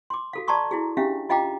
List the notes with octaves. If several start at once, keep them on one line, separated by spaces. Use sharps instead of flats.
C6 D6
F#4 A4 F5
D5 A5 A#5 C6 C#6 D#6
E4 F#4 G#4
C#4 D4 G4 E5 F5
F4 D#5 F5 G5 A#5 D6